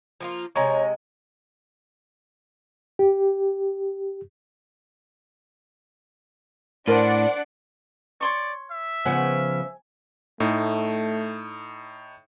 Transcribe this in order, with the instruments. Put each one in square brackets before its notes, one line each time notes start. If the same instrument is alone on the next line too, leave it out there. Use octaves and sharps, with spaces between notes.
[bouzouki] F3 A#3 F4
[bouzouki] C3 G#3 [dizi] C#5 [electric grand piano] G#5 A#5 C#6
[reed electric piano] G4
[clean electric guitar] A2 [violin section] D4 D5 F#5 [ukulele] A#4 C5
[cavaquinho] C#5 C6 C#6 [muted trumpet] D5
[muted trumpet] E5
[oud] C#3 F3 B3 [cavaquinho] G#5
[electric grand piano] A2 D#4 [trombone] A3